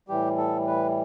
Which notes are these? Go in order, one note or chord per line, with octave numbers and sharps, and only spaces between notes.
A2 E3 G3 G4
A4
B4